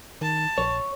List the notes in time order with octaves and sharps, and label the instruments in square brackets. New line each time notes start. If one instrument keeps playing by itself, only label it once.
[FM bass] D#3 [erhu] A5
[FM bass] A#1 [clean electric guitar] C#5